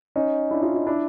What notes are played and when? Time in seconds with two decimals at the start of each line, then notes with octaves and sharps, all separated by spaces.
0.16 C#4 D#4
0.51 D4 E4
0.63 D#4 F4
0.75 D#4 F4
0.87 D4 E4